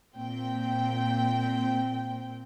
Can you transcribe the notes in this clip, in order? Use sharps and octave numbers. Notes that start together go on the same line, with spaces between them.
A#2 C4 G5